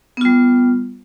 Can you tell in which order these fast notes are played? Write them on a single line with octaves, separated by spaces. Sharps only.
B3 F4 G3